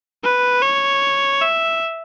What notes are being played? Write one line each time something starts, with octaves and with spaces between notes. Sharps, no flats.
B4
C#5
E5